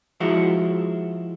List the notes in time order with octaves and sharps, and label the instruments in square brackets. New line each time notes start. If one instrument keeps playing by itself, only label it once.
[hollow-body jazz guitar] F3 G#3 E4 F#4